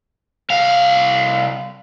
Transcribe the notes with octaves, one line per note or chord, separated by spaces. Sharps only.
C2 F5